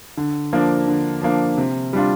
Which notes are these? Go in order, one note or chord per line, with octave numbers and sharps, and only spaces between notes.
D3
F3 A#3 D4
D3
F3 A#3 D4
C3
G3 D4 F4